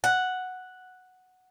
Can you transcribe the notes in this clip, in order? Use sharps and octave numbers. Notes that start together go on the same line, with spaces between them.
F#5